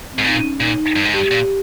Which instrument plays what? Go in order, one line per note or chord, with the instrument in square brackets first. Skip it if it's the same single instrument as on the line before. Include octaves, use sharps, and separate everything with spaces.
[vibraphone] C4
[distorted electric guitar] G#2
[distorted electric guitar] A#2 [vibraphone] D#4
[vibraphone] C#4
[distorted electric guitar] A#2 [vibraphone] D#4
[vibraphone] D#4
[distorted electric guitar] G2
G#2
[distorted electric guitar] G2 [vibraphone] G4
[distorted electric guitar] A#2